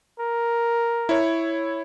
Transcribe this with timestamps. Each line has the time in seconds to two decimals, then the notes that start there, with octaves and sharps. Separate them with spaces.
0.20 A#4
1.09 E4 C#5